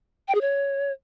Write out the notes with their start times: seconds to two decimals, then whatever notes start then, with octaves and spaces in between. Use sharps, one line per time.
0.28 G5
0.35 G#4
0.41 C#5